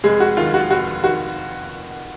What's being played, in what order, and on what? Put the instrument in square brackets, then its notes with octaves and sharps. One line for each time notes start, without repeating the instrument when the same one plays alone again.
[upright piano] F1 G#3 G#4
F#4
D#2 D#3 F4
F#4
F1 F#4
D#3 F#4